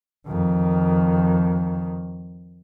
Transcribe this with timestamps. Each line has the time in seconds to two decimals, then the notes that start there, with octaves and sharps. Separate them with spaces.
0.27 F2 D#3